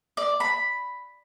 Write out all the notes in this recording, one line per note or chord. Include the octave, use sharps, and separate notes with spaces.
D5
B5